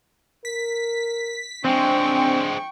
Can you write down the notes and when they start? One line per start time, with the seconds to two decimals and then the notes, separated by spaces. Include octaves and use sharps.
0.45 A#4 B6
1.65 F3 G#3 C4 D4 G5 C#6